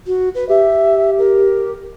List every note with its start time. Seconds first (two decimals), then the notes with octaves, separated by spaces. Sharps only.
0.07 F#4
0.35 B4
0.49 G4 E5
1.18 A#4